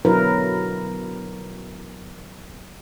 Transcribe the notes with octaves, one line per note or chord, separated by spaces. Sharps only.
B2 D3 F#3 E4 A#4 B4